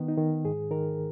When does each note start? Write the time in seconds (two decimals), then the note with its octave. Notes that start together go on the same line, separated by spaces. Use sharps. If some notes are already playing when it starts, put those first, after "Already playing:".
Already playing: D#3 B3
0.08 D#4
0.18 D#3
0.44 G#2 G#4
0.71 D#3 A#4